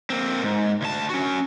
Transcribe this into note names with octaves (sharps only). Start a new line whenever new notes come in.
A#3 C4
G#2
D2 A5
C#4 F#4